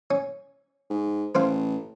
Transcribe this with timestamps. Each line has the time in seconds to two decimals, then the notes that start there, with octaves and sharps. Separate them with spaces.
0.11 C#4
0.90 G#2
1.35 A1 B4 C5 F5